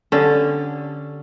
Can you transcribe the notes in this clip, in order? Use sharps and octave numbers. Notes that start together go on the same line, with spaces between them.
D3 C#4 G4 A4